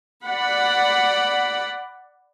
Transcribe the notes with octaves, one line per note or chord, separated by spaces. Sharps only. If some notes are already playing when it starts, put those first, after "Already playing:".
D5 F#5 B5